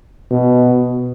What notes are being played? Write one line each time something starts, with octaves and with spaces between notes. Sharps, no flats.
B2